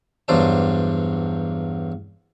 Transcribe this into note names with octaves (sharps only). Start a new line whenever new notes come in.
E2 G2 F#3 C5 D5 A5